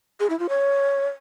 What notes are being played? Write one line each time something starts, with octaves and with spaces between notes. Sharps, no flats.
G#4
E4
F4
C#5